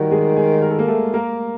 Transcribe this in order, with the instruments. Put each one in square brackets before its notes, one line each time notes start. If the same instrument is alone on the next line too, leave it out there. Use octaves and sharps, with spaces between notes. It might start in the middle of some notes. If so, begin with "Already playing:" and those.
Already playing: [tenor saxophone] D#3 [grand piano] G3 F#4 G4
[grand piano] G#3 G#4
G#3 G#4
A#4
A4
A#3 A#4
A3 A4
A#3 A#4